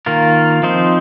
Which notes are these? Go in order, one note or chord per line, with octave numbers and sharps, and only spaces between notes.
D#3 A#3 F4 A#4
F3 C4 D#4 C5